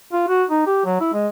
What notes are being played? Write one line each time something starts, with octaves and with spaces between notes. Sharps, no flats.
F4
F#4
D#4
G4
F#3
E4
G#3